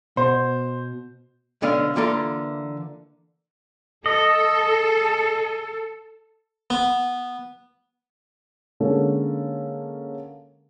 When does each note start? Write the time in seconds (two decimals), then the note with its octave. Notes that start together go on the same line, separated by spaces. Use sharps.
0.17 B2 C5
1.62 B1 D3 B3 D5 F5
1.96 D3 E3 A#3 F4 A4 B4
4.06 A4 D#5
6.70 B3
8.80 D3 G#3 A#3 C#4 A4 A#4